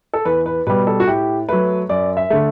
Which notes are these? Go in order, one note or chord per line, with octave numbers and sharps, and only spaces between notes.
A4
E2 B4
B4
B2 G3 B4
A4
F#4
A2 G4
F#3 A3 B4
F#2 D5
E5
D3 A3